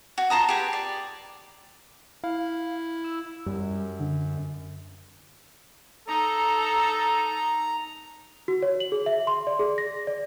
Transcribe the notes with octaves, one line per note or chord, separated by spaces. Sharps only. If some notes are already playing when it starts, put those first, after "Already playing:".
F#4
F4 A5 A#5 D#6
G4 G#4 B4
D5
E4 F5
E6
F#2 G3
D3
D#4 A4 A#5
F#4
C#5
F#7
G#4
E5
C6
D5
G#4
A#6
D5